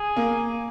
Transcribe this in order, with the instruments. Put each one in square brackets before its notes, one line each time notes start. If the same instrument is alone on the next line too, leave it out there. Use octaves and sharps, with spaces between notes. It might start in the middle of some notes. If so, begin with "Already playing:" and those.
Already playing: [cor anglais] G#4
[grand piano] A#3